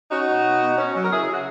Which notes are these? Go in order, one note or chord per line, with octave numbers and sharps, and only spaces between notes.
C#4 D#4 F#4
B2
B2
B2
C#4
F#3
A#4
C#3 E4 G#4
C#3 F#4